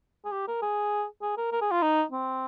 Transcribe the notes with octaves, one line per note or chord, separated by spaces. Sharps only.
G#4
G4
A#4
G#4
G#4
A#4
A#4
G#4
F4
D#4
C4